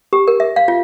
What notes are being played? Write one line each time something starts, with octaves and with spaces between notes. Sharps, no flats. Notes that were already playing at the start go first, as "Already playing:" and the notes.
G4
A#4
E5
F5
F4